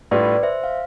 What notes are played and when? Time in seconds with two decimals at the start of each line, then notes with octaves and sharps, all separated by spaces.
0.11 A2 G3 D4 F4 B4 D5
0.43 C5 E5
0.64 F5